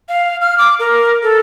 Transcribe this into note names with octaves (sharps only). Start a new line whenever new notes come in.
F5
F6
D6
A#4
A4